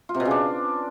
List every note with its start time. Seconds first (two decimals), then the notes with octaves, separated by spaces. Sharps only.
0.09 F4
0.14 C3
0.20 B2
0.25 C#3
0.31 D4